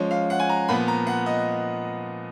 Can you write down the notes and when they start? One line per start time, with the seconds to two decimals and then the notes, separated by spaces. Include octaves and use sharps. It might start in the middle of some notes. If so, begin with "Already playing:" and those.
Already playing: F3 G#3 C#4
0.11 F5
0.30 F#5
0.39 G#5
0.49 A#5
0.68 A#2 F3 B3 B5
0.88 A#5
1.07 F#5
1.26 D#5